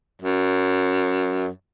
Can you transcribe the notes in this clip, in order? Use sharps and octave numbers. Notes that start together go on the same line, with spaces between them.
F#2